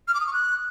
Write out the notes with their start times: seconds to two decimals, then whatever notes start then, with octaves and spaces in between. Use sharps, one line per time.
0.08 F6
0.14 D6
0.20 D#6
0.27 C#6
0.33 F#6